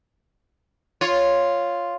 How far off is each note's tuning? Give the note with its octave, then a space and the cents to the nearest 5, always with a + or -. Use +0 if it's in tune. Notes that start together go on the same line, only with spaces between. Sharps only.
F4 +0 C#5 +0